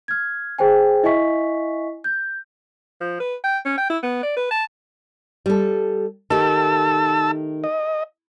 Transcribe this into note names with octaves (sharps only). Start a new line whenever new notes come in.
F6 G#6
G#4 C5 G5 G#5
E4 D#5 E5 G#5 C#6 B6
G6
F3
B4
G5
C#4
G5
E4
B3
D5
B4
A5
G3 A4
D#3 A3 G4 A5 E6
D#5